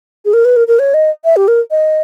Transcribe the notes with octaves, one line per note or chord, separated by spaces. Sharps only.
G#4
A#4
B4
A#4
A#4
C#5
D#5
E5
G4
A#4
D#5